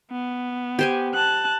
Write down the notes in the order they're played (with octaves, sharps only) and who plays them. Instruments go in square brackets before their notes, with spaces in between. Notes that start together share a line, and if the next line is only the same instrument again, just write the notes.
[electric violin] B3
[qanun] G4 C5 G#5
[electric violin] A5 F#6